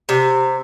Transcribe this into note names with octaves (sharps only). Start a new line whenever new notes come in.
C3